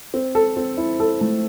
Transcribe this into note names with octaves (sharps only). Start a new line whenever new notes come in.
C4
A4
C4
E4
A4
A3